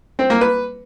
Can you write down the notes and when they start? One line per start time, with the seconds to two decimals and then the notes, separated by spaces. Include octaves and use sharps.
0.19 C4
0.30 A#3
0.41 B4